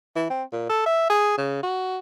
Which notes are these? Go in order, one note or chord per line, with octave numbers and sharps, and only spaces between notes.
E3
C4
A#2
A4
E5
G#4
C#3
F#4